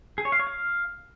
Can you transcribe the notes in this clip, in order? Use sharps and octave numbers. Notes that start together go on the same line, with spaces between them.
G#4
C#5
F5
C#5
F5